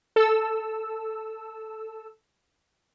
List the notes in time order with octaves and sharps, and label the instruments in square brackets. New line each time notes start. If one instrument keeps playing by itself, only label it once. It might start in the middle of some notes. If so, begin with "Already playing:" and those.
[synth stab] A4 E6